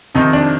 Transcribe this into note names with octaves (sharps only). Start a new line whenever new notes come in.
F2 C3 D#3 D#4
D4